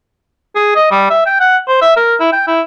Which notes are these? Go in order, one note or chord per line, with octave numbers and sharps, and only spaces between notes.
G#4
D#5
G3
E5
G5
F#5
C5
E5
A#4
E4
G5
E4